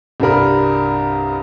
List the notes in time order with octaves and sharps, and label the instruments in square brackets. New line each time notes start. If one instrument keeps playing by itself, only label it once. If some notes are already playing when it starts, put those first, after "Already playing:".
[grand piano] C2 G2 G3 A#4 B5